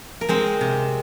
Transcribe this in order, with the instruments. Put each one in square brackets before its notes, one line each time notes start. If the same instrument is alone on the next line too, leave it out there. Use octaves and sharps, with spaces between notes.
[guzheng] A#4
G#3 C4 C5
C3